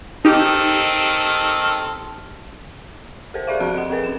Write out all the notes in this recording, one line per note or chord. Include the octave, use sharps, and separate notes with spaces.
D#3 C4 D#4 G4 A4
G4 A4 A#4 C5
G4 G#4 D5 E5 F5
F3 C4 F#4 A5 F#6 D7
D#5 F#5
C4 G#4 A#4 B4
C#4 E7